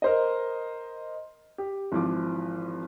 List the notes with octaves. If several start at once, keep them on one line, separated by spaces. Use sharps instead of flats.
A#4 C5 D#5
G4
G#1 E3 F3 D6